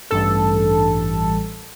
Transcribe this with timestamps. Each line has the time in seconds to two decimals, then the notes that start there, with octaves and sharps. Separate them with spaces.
0.11 A1 G2 A4